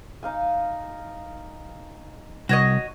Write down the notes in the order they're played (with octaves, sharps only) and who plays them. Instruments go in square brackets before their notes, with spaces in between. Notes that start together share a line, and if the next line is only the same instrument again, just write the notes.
[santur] D#4 F5 G#5
[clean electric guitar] C2 [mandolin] F#4 C#5 D#5